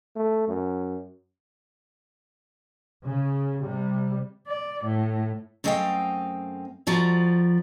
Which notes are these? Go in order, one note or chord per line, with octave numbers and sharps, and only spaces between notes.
A3
F#2
C#3
C3 G3
D5
A2
F#2 A3 C4 D#5 F5 G5
F2 F3 F#4 D5 A#5